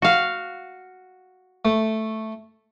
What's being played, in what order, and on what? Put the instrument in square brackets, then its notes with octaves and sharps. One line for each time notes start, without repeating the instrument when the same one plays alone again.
[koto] F#4 F5
[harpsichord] A3